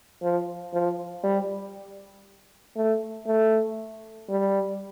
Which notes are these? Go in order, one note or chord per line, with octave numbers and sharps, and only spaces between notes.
F3
F3
G3
A3
A3
G3